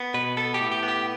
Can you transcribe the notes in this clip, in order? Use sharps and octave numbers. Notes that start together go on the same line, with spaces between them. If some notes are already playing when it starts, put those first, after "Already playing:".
Already playing: B3
B2 B4
B3 A4
G4
A2
G4
B3
G4